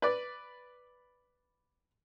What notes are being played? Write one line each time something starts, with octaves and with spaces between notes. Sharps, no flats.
B4 D5